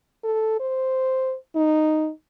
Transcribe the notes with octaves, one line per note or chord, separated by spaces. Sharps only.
A4
C5
D#4